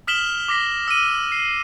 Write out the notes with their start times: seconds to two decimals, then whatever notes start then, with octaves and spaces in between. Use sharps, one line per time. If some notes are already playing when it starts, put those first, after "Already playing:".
0.07 D#6 F6 B6 E7 F#7 G7
0.48 D6 A#6 B6
0.88 E6 D#7
1.32 C7